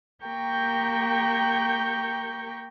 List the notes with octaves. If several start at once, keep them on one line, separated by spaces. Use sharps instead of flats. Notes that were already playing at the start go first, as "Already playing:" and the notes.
A#3 G4 A#4 G5 C#6 G6